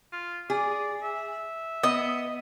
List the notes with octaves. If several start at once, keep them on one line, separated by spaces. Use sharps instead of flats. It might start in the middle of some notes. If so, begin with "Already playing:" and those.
F4
G#4 D5
E5
B3 D#5